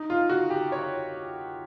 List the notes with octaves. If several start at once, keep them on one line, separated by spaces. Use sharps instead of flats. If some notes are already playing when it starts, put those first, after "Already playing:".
Already playing: D#4
F4
F#4
G4
C#5